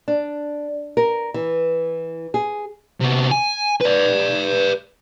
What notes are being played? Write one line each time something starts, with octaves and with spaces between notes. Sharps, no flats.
D4
A#4
E3
G#4
C3 B3
G#5
B4 D5